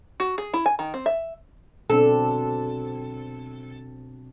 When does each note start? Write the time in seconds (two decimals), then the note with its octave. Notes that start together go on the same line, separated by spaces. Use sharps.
0.20 F#4
0.38 G#4
0.54 E4
0.66 G#5
0.79 D#3
0.94 C4
1.06 E5
1.90 B2 C4 D4 A4